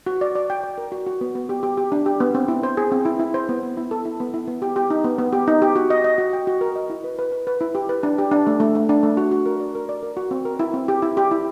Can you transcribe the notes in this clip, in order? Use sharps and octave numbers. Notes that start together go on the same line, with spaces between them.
F#4
D5
D5
G5
D5
A#4
F#4
F#4
B3
B3
G4
G4
G4
D4
G4
B3
C4
E4
C5
G#4
C4
E4
E4
C5
B3
B3
E4
A4
E4
B3
E4
B3
G4
G4
D#4
B3
B3
G4
D#4
G4
F#4
D#5
D#5
F#4
G5
F#4
A#4
D#5
E4
B4
B4
B4
B4
E4
G4
B4
D4
G4
D4
A3
A3
A3
D4
A3
F#4
F#4
A#4
D5
A#4
D5
A#4
F#4
C4
A#4
E4
C4
G4
E4
G4
E4